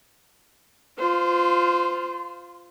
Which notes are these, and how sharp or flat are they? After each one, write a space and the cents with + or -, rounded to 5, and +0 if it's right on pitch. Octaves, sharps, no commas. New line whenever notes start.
F4 +0 C5 -25